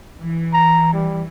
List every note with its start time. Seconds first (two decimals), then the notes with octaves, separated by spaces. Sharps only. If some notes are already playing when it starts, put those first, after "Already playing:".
0.19 E3
0.53 A#5
0.93 G3